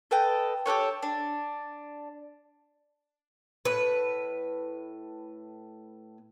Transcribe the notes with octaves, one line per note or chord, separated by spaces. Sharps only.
A4 B4 D#5 G5
G4 A4 B4 C#5
D4
A2 B4